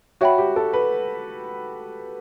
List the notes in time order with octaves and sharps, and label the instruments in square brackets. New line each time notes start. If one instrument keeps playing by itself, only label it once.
[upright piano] F#4 [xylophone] C#5 E5 G5 B5
[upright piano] G4
A4
B4